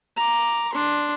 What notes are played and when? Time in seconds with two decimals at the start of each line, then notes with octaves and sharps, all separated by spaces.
0.17 A#5 D6
0.73 D4 C6